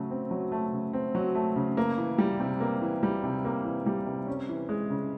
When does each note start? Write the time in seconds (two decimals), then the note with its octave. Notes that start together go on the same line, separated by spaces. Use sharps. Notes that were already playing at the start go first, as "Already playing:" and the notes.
Already playing: C#3 F#3 A3
0.10 C4
0.31 F#3
0.52 A3
0.73 C#3
0.93 C4
1.15 F#3
1.35 A3
1.56 C#3
1.77 A#3
1.98 E3
2.18 G3
2.40 C3
2.60 A#3
2.82 E3
3.03 G3
3.24 C3
3.45 A#3
3.65 E3
3.86 G3
4.07 C3
4.27 C#4
4.49 E3
4.69 G#3
4.90 C#3